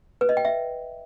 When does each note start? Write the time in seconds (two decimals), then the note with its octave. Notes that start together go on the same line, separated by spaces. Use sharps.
0.21 B4
0.29 D#5
0.37 G5
0.45 E5